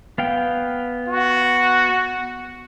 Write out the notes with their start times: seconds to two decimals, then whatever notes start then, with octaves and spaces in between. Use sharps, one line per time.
0.18 B3 F5 G5
1.08 F#4